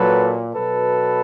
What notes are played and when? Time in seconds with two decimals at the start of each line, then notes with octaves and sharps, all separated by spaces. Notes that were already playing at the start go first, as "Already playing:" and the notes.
Already playing: A#2 F#3 A4 B4
0.54 B2 F#3 A4 B4